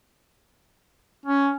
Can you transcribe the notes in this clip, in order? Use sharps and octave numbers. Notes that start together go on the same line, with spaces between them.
C#4